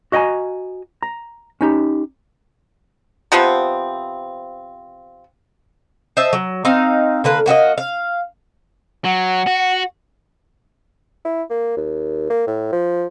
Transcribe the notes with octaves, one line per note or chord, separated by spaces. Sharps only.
F#4 D#5 G5 G#5 A#5
A#5
C#4 D#4 G4
C3 F3 B3 C4
C5 D#5 E5 A5
F#3
C4 D#4 F5
D3 A#3 B4
A#3 F#4 G4 D#5
F5
F#3 F#5
F#4
E4
A#3
D#2
A#3
A2
F3